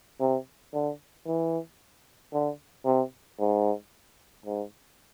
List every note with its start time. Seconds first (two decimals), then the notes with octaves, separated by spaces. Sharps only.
0.20 C3
0.74 D3
1.26 E3
2.33 D3
2.85 C3
3.39 G#2
4.46 G#2